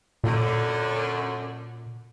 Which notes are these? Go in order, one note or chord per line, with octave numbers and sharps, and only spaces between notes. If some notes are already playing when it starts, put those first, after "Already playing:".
F#2 A#2 D3